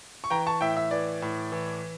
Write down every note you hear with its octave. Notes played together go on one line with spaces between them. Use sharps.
C#6
E3 G5 A#5
A5 C#6
A2 E5 G5
E5
E3 D5
A2
E3